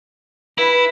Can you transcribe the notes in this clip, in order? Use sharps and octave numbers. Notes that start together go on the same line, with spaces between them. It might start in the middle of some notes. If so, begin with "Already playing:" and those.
E4 B4